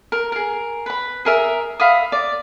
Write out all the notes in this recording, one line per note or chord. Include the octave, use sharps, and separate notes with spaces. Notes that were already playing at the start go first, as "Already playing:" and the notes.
A#4
G#4 A#4
B4 B5
G#4 A#4 E5
E5 F5 B5 D#6
D5